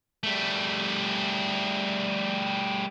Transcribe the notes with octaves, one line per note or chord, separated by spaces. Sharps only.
G3 A3